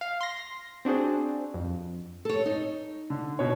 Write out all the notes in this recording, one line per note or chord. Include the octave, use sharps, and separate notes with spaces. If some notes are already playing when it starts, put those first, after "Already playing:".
F5
C6 A#6
C4 D4 F#4 G#4 C5
F2
A4 C#5
D#4
D3
B2 C#5